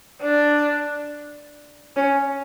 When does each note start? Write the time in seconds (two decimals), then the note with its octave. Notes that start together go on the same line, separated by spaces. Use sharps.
0.21 D4
1.96 C#4